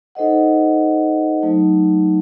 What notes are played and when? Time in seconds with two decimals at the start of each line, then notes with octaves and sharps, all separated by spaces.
0.15 D#4 A4 C5 D#5 F#5
1.42 F#3 A3 D#4